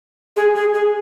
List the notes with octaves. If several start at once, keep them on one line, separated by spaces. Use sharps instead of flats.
G#4
G#4
G#4